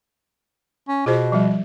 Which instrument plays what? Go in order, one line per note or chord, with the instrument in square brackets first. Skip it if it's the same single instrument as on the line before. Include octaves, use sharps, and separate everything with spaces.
[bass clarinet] C#4
[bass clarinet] B2 [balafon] F4 G#4 C5
[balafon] F3 G3